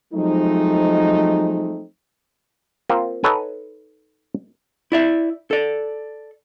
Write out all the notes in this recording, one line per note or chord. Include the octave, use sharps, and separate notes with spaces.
F3 F#3 G#3 A3 C4 D#4
A#3 C4 F4
D#4 A4 B4 C#5 F#5 G#5
E4 D5 E5
A4 D5